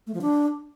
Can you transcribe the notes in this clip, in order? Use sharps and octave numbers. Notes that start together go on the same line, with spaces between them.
A3
F3
D4